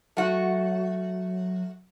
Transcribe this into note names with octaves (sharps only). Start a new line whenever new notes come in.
F#3 A3 F#4